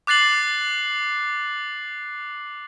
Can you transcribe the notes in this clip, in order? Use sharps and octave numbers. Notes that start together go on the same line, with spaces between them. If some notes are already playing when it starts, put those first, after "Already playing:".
D6 F#6 A6 C7 F#7